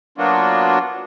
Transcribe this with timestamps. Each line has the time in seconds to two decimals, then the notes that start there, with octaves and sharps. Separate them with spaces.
0.18 F#3 A#3 B3 D4 F4 F#4